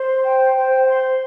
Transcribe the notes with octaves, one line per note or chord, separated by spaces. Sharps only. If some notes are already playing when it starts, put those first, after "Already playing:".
Already playing: C5 C6
G5
C5
C6